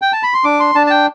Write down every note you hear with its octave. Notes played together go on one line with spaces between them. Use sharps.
G5
A5
B5
C6
D4 D6
C6
D4 A5
A5
G5